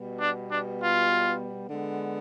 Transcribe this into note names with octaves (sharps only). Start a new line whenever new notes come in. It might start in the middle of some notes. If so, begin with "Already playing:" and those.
Already playing: B2 G3 B3
D4
D4
F4
D3 G#3 B3